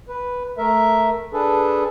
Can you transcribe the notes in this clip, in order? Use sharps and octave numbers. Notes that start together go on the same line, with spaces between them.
B4
A3 A#4 E5
D4 G#4 A4 B4